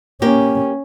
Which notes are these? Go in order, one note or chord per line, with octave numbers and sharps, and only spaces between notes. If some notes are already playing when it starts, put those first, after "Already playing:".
A#3 C#4 G4